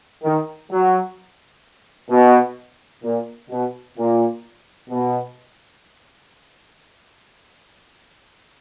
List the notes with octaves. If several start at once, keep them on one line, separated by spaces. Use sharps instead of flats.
D#3
F#3
B2
A#2
B2
A#2
B2